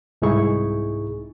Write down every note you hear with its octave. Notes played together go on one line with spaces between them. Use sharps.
C2 G#2 D#4 E4 G#4 C#6